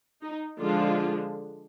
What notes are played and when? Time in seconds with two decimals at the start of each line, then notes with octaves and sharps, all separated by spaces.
0.22 D#4
0.60 D3 F3 G#3 D4 F4